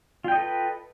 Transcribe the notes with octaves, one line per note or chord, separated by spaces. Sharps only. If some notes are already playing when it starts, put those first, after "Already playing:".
F4 A4 B4 D#5 G5